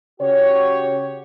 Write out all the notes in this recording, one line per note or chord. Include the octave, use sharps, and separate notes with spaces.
C#3 F#4 G4 C#5